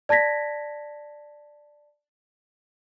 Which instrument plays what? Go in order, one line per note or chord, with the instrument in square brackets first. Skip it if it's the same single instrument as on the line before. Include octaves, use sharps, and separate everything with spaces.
[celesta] D5 A5 G#6 A#6 B6